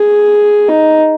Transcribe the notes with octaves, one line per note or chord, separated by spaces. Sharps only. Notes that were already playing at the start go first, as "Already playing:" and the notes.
Already playing: G#4
D#4